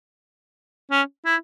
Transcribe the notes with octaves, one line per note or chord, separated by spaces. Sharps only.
C#4
E4